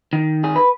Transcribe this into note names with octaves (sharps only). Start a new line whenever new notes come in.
D#3
G#4
B4